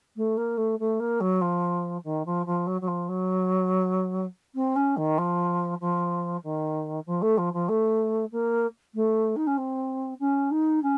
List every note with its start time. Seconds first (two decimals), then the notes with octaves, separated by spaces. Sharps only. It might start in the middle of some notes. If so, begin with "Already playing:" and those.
0.16 A3
0.37 A#3
0.57 A3
0.79 A3
1.00 A#3
1.20 F#3
1.41 F3
2.04 D#3
2.25 F3
2.46 F3
2.66 F#3
2.81 F#3
2.87 F3
3.08 F#3
4.55 C4
4.76 C#4
4.97 D#3
5.18 F3
5.80 F3
6.43 D#3
7.06 F3
7.22 A3
7.37 F3
7.53 F3
7.68 A3
8.31 A#3
8.94 A3
9.36 D#4
9.47 C#4
9.57 C4
10.20 C#4
10.51 D#4
10.83 C#4